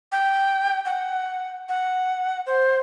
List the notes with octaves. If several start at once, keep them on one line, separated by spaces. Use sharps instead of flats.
G5
F#5
F#5
C5